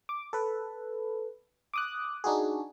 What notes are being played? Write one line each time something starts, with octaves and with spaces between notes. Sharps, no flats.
D6
A4 B4
D6 D#6 F#6
D4 D#4 F#4 G#4